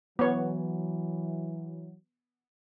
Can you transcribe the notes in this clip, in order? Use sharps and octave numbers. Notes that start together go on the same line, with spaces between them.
E3 F#3 B3 C#5